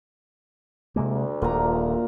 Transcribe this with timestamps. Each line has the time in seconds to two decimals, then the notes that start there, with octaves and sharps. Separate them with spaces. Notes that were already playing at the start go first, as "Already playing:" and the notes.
0.96 D2 C3 G#3 A#3
1.42 D#1 A#2 A#5